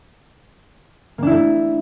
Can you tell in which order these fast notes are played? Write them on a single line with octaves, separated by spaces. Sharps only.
A#3 D4 E4 A3